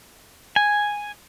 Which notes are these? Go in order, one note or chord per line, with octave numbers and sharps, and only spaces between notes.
G#5